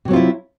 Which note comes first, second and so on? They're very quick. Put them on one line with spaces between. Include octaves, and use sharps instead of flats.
C3 F#3 C4 F4 E4